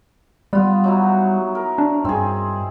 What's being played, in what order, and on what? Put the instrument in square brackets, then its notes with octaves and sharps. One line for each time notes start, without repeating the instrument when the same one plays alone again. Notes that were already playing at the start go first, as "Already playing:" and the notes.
[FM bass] G3 [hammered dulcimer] B3 F4
[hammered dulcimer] F#3 D#4 E4
A#4
[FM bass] D4
[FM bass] G2 [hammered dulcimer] C4 G#4